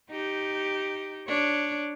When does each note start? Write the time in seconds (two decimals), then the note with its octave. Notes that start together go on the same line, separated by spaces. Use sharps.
0.11 D#4 G4
1.27 D4 C#5